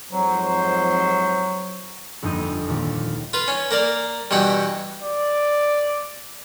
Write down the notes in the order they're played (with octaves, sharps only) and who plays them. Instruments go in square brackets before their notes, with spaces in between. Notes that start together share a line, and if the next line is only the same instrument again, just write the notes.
[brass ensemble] F2 G#2 C5 [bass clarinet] F#3
[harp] G1 F2 A#3 D#4 G6 D#7
D#2 A#2
[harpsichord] F4 B4
C#4
A#3 A#4 D5
G2 B2 E3 F#5 G5
[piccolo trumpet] D5